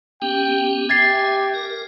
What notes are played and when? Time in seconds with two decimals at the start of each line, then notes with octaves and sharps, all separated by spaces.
0.22 B3 C#4 G4 G5
0.89 G4 E5 G#5 G#6 A6 C7
1.54 A#4